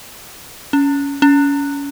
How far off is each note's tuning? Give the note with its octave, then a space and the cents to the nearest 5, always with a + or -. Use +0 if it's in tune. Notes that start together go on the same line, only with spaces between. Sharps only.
C#4 +20
C#4 +30